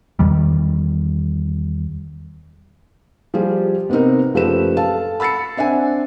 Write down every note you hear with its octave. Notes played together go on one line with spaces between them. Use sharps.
E2 D#3 G3
F3 G3 F4 G4 G#4
C3 B3 C4 D#4 A#4
F#1 F3 A3 G4 B4 E7
A4 F5 A5
B5 E6 A6 C7 C#7
C4 D4 E5 F#5 G#5